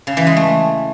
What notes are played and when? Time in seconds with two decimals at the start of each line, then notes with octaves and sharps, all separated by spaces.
0.07 C#3
0.17 E3
0.27 G#3
0.37 A3